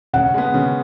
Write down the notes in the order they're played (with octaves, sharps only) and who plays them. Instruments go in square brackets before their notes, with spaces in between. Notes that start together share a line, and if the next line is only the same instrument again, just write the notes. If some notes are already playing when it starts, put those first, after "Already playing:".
[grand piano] C#3 [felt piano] F#5
[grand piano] G#3 B3
C#3